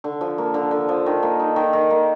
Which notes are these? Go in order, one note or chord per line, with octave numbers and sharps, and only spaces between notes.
D3
F3
A#3
D3
D3
F3
D#3
A#3
D#4
D#3
D#3
A#3